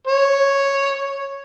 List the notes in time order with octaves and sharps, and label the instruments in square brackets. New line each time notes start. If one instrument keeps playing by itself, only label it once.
[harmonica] C#5